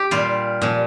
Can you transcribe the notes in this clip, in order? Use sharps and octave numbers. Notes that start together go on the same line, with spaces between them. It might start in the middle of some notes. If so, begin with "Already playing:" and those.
Already playing: G4
A#2 G3 F4
A#2 F3